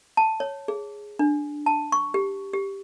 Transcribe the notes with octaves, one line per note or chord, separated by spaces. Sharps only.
A5
C#5
G#4
D4
A5
C#6
G4
G4